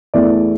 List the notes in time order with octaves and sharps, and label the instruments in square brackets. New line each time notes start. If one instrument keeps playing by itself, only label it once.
[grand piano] E2 E3 A3 D5